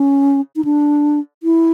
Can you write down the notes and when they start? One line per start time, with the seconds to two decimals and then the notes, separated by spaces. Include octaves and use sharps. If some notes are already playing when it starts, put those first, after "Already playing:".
Already playing: C#4
0.56 D#4
0.65 D4
1.43 E4